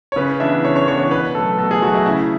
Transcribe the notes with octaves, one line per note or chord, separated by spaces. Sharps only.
C#5
C#3 B4
E3 B3 D4 E5
C#3 C#5
C#5
E3 B3 D4 C#5
C#5
B2 B4
F#3 A3 A4
B2 A4
G#4
F#3 A3 F#4
E4
C#3 E4